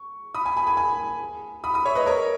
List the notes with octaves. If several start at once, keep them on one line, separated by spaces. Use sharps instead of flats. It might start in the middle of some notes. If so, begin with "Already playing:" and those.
Already playing: C#6
B5 D#6
G#5 B5
G#5 B5
G#5 B5
G#5 B5
B5 D#6
B5 D#6
C#5 E5
B4 D#5
A#4 C#5